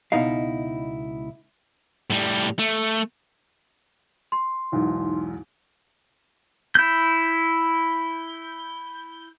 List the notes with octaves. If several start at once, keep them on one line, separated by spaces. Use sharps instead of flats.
C#2 B2 D#4 E4 F5
A2 G3
A3
C6
B1 E2 G#2
E4 G6